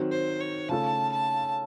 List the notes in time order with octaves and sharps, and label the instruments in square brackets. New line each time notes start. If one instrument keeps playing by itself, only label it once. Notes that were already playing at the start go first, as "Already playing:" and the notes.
Already playing: [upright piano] D#3 F#3 C4
[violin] C5
C#5
[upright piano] C#3 A3 C#4 F4 A4 [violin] A5
[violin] A5